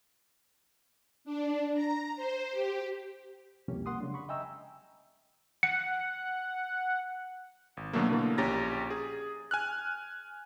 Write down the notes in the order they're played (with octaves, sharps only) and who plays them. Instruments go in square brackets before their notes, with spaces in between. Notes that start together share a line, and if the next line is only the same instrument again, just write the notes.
[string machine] D4
A#5
C5
G4
[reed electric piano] C2 F2 B2 A#3 C#4 G4
G3 A#3 F#5 C6 D#6
C#3 F#3 G#3 D4
B5 C#6
D#5 E5 G5 G#5 A#5 E6
[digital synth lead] F#5 [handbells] C#7
[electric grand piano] G#1
B2 D3 F#3 A3 A#3
B2 D3 E3 A#3
A#1 C#4 G4 A#5 A6 A#6
G#4
G#5 F6 F#6